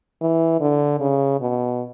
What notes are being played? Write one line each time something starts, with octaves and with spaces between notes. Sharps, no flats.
E3
D3
C#3
B2